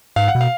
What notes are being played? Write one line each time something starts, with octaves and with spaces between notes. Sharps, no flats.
G#2 F5
F#5
B2
F5